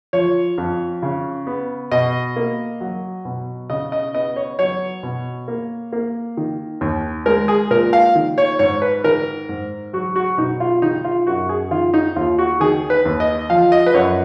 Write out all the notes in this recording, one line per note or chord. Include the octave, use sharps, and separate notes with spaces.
F3 C#5
F2
C#3
B3
B2 D#5
A#3
F#3
B2
C#3 D#5
D#5
B3 D#5
C#5
F#3 C#5
B2
A#3
A#3
D#3
D#2
G#3 A#4
G#4
A#2 A#4
F5
D#3
C#5
G#2 C#5
B4
D#3 A#4
G#2
F#3 F#4
F#4
B2 D#4
F4
D#3 D#4
F4
F#2 F#4
G#4
D#3 F4
D#4
D#2 F4
F#4
D#3 G#4
B4
D#2
D#5
F3 F5
D#5
B4
F#2 C#5